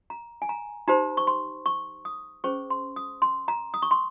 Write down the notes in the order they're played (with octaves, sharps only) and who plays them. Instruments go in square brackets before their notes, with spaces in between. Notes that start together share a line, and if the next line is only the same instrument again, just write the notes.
[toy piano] A#5
G#5
A#5
D#4 G4 C5 A#5
C#6
C6
C#6
D#6
C#4 G#4 C5 C#6
C6
D#6
C6
A#5
D#6
C#6
C6